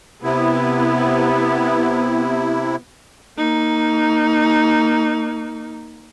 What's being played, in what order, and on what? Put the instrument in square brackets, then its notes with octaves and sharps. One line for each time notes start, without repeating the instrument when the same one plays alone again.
[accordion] C3 E4 [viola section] B3
[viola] A#3 D#4